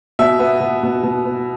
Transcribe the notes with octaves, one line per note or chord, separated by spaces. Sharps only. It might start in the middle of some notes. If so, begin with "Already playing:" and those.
B2 E5
B3
B2
B2
B2
B3